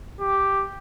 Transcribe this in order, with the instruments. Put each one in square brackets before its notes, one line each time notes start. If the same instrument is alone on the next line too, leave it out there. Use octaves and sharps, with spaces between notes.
[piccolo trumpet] G4